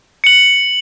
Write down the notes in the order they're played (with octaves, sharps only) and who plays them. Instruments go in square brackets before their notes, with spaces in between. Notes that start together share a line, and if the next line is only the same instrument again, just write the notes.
[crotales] C#7 F#7